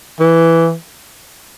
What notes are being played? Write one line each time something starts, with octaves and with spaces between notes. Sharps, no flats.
E3